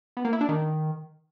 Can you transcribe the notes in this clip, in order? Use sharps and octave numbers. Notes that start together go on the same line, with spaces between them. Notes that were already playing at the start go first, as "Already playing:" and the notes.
B3
A#3
E4
D4
D#3